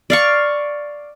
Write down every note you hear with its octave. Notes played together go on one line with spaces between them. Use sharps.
D5 F5 C#6